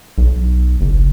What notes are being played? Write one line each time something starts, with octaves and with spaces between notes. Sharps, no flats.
B1
F#1